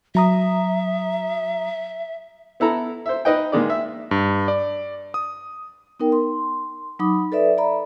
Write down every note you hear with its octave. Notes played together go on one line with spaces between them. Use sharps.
F#3 E5 A#5 D#6
B3 E4 A4 A#5
C5 E5
D#4 B4 D#5 G5
A#2 D#3 G#3 D5
E5
G2
D5
D#6
B3 D#4 A#4 G5
C6
F#3 D#4 B5 D6 D#6
A4 B4 D5 E5
D5 E5 A#5 B5